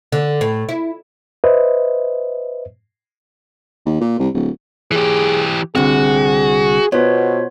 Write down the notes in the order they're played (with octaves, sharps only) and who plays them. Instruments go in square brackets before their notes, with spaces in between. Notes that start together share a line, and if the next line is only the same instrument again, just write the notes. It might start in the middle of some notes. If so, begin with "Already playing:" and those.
[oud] D3
A2
E4
[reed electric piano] B4 C5 D#5 E5
[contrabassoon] D#2
A#2
C2
D1
[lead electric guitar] E3 G4 [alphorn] G#4
[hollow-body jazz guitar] C2 D3 [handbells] C4 [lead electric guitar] F#4 [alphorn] G#4
[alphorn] B2 [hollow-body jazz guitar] B3 [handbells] F4 C5 C#5